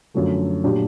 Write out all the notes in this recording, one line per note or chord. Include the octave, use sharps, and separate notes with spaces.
F#2 D3 F3 A3
A#2 F#3 A3 D4 G4